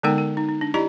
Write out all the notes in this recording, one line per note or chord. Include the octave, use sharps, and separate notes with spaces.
D3 G#3 B3 D#4 A#4 G5
A#4
D#4
D#4
D4
E4 G4 D5 D#5 A#5